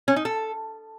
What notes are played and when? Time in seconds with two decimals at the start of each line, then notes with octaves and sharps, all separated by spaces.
0.08 C#4
0.16 D#4
0.25 A4